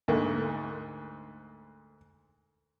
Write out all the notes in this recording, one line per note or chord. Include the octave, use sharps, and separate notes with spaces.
D2 G#2 A3 A#3